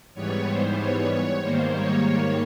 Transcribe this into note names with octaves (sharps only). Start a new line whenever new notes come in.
G#2 E3 G3 B3 C#5
C5
C#5
C#5
G#2 D#3 G3 A#3 C5
C#5
C#5